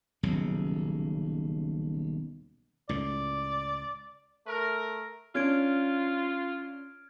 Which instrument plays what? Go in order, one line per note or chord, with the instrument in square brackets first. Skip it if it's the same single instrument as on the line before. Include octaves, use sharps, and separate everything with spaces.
[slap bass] D#1 B1 C#3
[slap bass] C#2 A2 [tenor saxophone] D5
[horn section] A3 A#4
[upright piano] C#4 D4 [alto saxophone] F4 [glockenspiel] F6 G#6 D7